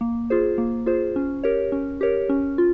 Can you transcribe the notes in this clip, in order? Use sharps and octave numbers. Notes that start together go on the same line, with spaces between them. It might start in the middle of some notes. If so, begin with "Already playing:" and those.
A#3
F4 G#4 C5
A#3
F4 G#4 C5
C#4
G4 A#4 C#5
C#4
G4 A#4 C#5
C#4
F4